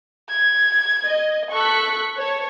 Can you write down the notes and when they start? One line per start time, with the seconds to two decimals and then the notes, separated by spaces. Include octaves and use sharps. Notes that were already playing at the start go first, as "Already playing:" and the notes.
0.29 G#6
1.06 D#5
1.53 A4 C#6 F#6 B6
2.19 C#5 A5